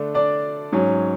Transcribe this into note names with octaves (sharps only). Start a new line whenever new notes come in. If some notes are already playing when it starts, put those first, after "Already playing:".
Already playing: D3 A3 D4
D4 D5
G#2 F#3 C#4